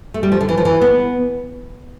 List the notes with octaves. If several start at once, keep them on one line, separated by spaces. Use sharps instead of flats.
A3
G3
F3
D3
E3
F3
E3
B3